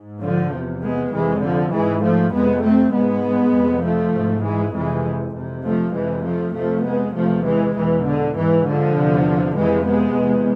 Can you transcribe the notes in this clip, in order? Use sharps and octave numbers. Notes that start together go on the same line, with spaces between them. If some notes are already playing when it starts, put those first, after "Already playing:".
Already playing: G#2
D3 F3
E2 C3
G#3 B3
F2 C3 E3 G#3
D3 F3
G#2 E3 G#3
F3 A3
F2 C3 G#3 B3
A3 C4
G#2 G#3 B3
F2 C3
F3 A3
G#2
E3 G#3
F2 C3 E3 G#3
F2 C3
F3 A3
F2 C3 E3 G#3
F3 A3
F2 C3 F3 A3
G#3 B3
E2 C3 F3 A3
E3 G#3
E2 B2 E3
D3
G#2 E3
D3 F3
E2 C3
F2 C3 E3 G#3
G#3 B3
E2 C3